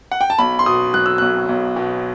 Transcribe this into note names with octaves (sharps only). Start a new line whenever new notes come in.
F#5
G5
A5
B1 B5
C6
B2 D#6
F#3 F#6
E6
B1 F#6
B1
B2